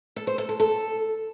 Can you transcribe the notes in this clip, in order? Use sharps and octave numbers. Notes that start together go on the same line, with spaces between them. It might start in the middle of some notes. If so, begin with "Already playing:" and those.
A4
C5
A4
A4
A4